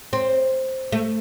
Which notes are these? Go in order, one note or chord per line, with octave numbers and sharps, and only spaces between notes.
C4
A3